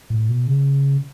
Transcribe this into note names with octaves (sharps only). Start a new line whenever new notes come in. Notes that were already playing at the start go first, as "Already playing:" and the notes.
A2
B2
C#3